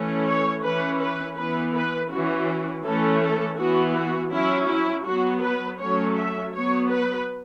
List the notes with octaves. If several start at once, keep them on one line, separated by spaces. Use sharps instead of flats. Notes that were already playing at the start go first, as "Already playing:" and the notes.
Already playing: E3 A3 C#4
C#5
E3 C#4 B4
B4
E3 B3 B4
B4
E3 C#4 F#4
E3 A3 C#4 A4
A4
E3 B3 F#4
F#4
F#3 C#4 E4
E4
F#3 B3 F#4
B4
F#3 A3 C#4 C#5
E5
F#3 B3 C#5
B4